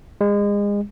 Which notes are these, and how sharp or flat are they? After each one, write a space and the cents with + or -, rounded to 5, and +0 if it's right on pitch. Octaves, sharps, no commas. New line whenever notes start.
G#3 -30